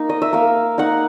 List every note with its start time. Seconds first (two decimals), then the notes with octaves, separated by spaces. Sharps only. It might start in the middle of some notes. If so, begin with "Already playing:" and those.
Already playing: A#3 D#4
0.09 D#5
0.22 E5
0.33 A#3 F5
0.78 D#4 F#5